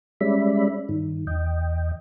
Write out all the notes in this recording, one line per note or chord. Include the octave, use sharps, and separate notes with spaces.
G3 G#3 C#4 D5 E5 B5
G2 D#3
E2 D#5 G5